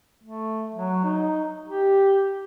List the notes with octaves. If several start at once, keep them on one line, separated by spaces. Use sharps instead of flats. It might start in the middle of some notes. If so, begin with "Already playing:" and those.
A3
F#3
D#4
G4